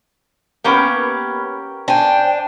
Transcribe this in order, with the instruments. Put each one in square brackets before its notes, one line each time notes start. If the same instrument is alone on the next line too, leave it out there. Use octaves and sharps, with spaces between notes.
[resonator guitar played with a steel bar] A#3 B3 B4 [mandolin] C#4 G4 A#4
[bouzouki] D4 G#5 [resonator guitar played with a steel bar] C5 [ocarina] G5